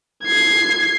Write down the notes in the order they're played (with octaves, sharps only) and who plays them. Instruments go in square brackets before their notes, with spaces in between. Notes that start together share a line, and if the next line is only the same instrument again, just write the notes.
[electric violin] G#6 C7